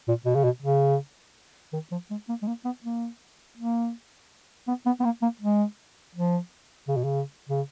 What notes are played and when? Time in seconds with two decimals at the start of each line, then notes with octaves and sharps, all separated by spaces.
0.08 A#2
0.26 B2
0.35 C#3
0.44 B2
0.63 C#3
1.73 D#3
1.92 F3
2.11 G#3
2.29 A#3
2.42 G#3
2.48 A#3
2.65 B3
2.84 A#3
3.58 A#3
4.68 B3
4.86 B3
5.00 B3
5.05 A#3
5.22 A#3
5.41 G#3
6.15 F3
6.88 C#3
6.97 B2
7.04 C#3
7.50 C#3